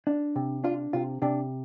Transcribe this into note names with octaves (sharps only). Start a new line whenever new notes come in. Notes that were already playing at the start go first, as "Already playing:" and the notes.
D4
C3
D4 F4
C3 F4
C3 D4